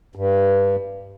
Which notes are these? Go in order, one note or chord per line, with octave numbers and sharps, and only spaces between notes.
G2